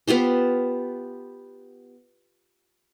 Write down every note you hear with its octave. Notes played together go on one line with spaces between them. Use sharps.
B3 F4 G4 C5